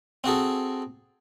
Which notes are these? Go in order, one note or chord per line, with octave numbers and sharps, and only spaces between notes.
C4 F#4 G#4 A4